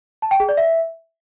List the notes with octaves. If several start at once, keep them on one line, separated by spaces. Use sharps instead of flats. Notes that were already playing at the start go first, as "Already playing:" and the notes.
A5
G5
G#4
D5
E5